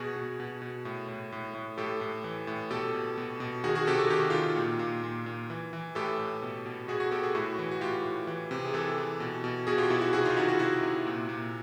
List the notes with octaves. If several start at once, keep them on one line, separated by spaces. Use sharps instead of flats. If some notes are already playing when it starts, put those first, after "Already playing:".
Already playing: B2 F#4 G#4
B2
B2
B2
A2
A2
A2
A2
A2 G4 A4
A2
E3
A2
B2 G4 A4
B2
B2
B2
D#3 F#4 G#4
F#4 G#4
C3 G4 A4
F#4 G#4
D#3 G4
F#4
D#3 F4 G4
A#2
A#2
A#2
A#2
E3
E3
A2 G4 A4
A2
B2
B2
B2 F#4 G#4
F#4 G#4
B2 G4 A4
F#4 G#4
A2 E4 F#4
E3
F#4
A2 F4 G4
A2
E3
C3
G#4
E3 G4 A4
E3
B2
B2
B2 F#4 G#4
F4 G4
B2 E4 F#4
E4 F#4
C3 F#4 G#4
D#4 F4
D#3 E4 F#4
F#4 G#4
C3 E4 F#4
C3
A#2
A#2